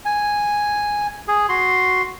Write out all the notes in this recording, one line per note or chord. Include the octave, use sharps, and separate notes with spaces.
G#5
G#4
F#4 C6